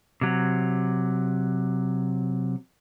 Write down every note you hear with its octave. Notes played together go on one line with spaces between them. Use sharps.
C3 F#3